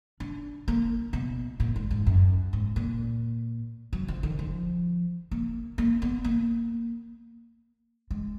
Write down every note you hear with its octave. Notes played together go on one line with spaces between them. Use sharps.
D4
A#3
B2
A#2
G#2
G#2
F#2
G#2
A#2
F#3
F3
D#3
F3
A#3
A#3
B3
A#3
G#3